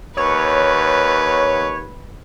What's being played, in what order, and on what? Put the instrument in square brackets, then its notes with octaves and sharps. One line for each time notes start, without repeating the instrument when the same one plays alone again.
[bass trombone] D#2 [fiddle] B4 [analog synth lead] C#5